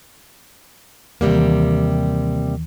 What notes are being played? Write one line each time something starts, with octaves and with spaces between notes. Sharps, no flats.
D#2 C3 D#3 E3 G3 A#3